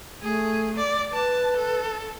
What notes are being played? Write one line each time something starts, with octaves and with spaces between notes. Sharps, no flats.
A3 G#4
D5
B4 A5
A4